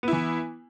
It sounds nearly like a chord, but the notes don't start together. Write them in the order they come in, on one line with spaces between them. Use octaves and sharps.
B3 E4 E3